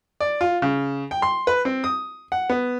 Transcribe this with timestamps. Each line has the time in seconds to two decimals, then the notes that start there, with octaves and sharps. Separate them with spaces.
0.20 D5
0.41 F4
0.62 C#3
1.11 G5
1.22 C6
1.47 B4
1.65 C4
1.84 D#6
2.32 F#5
2.50 B3